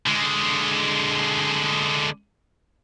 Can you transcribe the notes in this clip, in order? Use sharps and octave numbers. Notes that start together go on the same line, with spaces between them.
D3 G#3